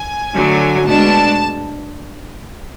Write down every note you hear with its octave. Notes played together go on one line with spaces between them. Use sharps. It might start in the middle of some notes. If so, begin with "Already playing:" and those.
Already playing: G#5
D3 F#3 A3
B2 G#3 D4 A5